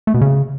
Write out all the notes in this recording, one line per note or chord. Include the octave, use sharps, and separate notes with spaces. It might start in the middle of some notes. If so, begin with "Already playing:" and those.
A3
B2
C#3